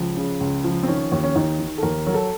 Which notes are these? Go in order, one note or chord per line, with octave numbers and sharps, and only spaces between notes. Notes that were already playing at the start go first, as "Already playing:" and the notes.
Already playing: C#2 F3
C#3
C#2
F3
C4
D#3 C#4
D#2
C#4
D#2 D#4
D#3
A4
D#2 A#4
F#3 A#4
A4